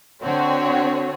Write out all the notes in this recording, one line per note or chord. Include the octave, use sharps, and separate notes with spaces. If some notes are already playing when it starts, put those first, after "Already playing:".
D3 C4 F#4 C#5